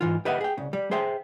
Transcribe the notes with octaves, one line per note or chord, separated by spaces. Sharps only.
G#2 E3 F4
G4 B4 D#5 E5 F#5
G#4 G5
C2 C#3
G3
G#4 C5 E5 G5